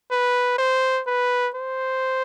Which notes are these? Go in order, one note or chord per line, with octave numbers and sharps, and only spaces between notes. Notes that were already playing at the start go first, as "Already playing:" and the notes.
B4
C5
B4
C5